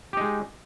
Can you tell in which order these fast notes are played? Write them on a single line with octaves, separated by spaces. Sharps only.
G4 D#4 G#3